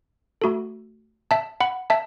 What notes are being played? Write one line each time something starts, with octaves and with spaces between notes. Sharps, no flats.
A3 F#4 A4
E5 A5
F#5 B5
E5 A5